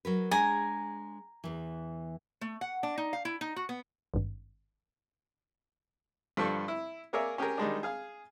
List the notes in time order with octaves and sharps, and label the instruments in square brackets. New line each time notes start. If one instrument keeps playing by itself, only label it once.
[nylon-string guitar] F#3 A#4 B4
[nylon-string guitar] G#3 D4 [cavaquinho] G#5 A#5
[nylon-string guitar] E2 E3
[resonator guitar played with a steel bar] A3
F#5
D4
D#4
F5
E4
D#4
F#4
B3
[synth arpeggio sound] G#1 G2
[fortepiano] G2 D3 F3 G3 A4 C#6
E4
A#3 G#4 A#4 C#5 D5 E5
C#4 G4 G#4 A#4
D#3 G3 G#3 D4
G#4 F5 G#5